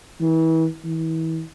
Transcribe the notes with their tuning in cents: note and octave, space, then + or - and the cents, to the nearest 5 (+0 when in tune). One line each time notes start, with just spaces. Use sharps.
E3 -30
E3 -35